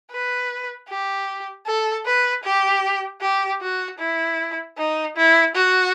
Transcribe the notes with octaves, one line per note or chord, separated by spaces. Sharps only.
B4
G4
A4
B4
G4
G4
F#4
E4
D#4
E4
F#4